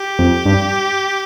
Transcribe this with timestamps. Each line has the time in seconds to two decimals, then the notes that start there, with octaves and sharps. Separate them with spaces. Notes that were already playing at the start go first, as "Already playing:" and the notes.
Already playing: G4
0.19 F2
0.45 G2